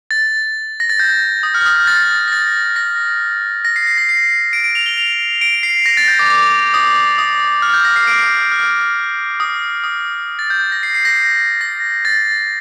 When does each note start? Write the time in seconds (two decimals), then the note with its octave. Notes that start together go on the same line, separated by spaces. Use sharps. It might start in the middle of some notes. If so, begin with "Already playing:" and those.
0.11 A6
0.80 A#6
0.90 A6
0.99 G6
1.43 D#6
1.54 F6
1.66 D#6
1.77 G6
1.87 A6
2.28 A#6
2.32 A6
2.76 A#6
3.65 A#6
3.76 C7
3.87 C7
3.98 A#6
4.09 C7
4.53 D7
4.64 D7
4.75 F7
4.86 G7
4.97 F7
5.41 D7
5.63 C7
5.86 A#6
5.97 A6
6.08 G6
6.19 D6
6.30 D6
6.74 D#6
7.18 D#6
7.62 F6
7.74 G6
7.85 A#6
7.96 C7
8.07 D7
8.52 F6
9.40 D#6
9.84 D#6
10.39 A6
10.50 G6
10.72 A#6
10.83 C7
10.94 C7
11.05 A#6
11.61 A#6
12.05 A6